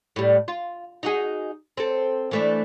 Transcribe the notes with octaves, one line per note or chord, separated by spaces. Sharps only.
A2 G3
F4
D#4 F#4 G#4
C4 A4
E3 A3 D4